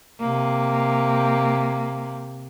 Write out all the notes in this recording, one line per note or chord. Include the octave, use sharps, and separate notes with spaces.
C3 A#3